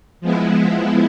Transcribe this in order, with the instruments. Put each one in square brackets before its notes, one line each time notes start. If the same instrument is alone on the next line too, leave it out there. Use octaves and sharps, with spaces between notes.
[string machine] F3 G#3 B3 E4